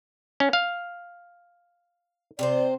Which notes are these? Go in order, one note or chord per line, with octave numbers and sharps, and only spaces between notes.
C#4
F5
C3 C4 C5 D5